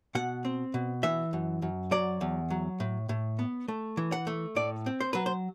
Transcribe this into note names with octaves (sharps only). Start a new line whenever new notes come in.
B2 F#5
C4
B2
E3 E5
F#2
F#2
F#3 D5
E2
F#3
A2
A2
B3
A3
E3
F#5
A3
A2 D5
C4
C5
F#3 B4
C5